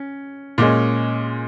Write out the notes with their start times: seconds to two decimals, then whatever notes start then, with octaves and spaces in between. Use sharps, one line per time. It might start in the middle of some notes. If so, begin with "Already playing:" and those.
Already playing: C#4
0.58 A#2 G#3 C#4